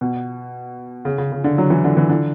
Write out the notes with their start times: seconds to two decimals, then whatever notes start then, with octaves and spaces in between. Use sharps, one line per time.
0.01 B2
1.05 C#3
1.18 C#3
1.32 C#3
1.44 D3
1.58 F#3
1.70 E3
1.84 D3
1.97 E3
2.09 D3